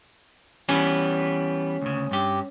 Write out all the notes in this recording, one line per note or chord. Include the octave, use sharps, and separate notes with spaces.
E3 G3 B3 C#4
D2 C#3
G2 G4